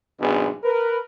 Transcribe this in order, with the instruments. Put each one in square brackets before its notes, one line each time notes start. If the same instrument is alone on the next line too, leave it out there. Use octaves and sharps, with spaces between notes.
[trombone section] G#1 F#2 B2 B3 D4 G#4
A#4 B4